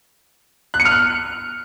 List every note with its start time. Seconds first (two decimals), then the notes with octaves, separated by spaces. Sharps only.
0.74 F#6
0.80 C#7
0.85 F6
0.91 F#6